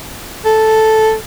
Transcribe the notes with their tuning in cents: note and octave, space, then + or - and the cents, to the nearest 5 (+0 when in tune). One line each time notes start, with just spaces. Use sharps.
A4 -5